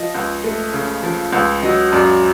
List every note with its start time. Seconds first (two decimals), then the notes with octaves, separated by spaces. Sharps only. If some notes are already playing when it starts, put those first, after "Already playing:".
Already playing: F3 D#5
0.14 C#2
0.44 A3
0.73 C#3
1.03 F3
1.33 C#2
1.62 F#3 D#5
1.92 F#2 D5